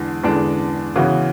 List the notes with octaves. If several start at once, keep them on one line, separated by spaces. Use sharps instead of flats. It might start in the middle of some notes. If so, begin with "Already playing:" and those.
Already playing: E2 D3 G#3 D4
E2 D3 G#3 D4
C#3 E3 B3 F#4